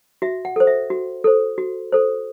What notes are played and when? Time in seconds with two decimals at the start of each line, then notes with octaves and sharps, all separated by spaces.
0.22 F#4 E5
0.45 F#5
0.56 A4 C5
0.67 E5
0.90 F#4
1.24 A4 C5
1.58 F#4
1.92 A4 C5